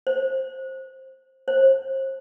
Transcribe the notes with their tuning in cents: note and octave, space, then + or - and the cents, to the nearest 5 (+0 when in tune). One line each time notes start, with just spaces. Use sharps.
C5 +15
C5 +35